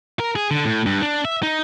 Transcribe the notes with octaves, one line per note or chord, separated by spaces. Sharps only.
A#4
G#4
D3
A2
G2
D4
E5
D#4